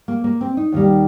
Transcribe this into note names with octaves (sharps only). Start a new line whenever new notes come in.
A#3
A#3
C4
D#4
D#2 D#3 G3